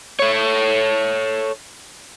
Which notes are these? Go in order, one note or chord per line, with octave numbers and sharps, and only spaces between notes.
A4 C#5